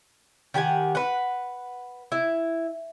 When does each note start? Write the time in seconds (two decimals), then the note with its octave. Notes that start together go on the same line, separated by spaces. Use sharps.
0.54 D#3 G4 F#5 G#5
0.95 B4 F#5
2.12 E4